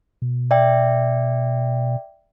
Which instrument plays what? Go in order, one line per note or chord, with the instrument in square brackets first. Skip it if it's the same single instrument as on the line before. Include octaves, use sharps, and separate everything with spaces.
[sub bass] B2
[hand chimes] D5 E5 G5